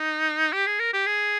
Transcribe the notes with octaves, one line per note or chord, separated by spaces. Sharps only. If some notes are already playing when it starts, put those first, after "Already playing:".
Already playing: D#4
G4
G#4
A#4
G4
G#4